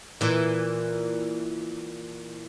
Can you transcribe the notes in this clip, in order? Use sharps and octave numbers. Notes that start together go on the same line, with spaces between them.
A#2 E3